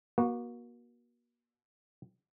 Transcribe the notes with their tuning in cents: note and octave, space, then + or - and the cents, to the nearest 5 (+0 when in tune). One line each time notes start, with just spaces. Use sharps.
A#3 +40 F#4 +0